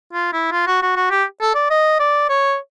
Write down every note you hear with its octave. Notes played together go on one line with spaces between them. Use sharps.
F4
E4
F4
F#4
F#4
F#4
G4
A4
D5
D#5
D5
C#5